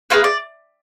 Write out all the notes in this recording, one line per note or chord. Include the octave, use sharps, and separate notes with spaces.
A#3 F4 G#4 B4
D5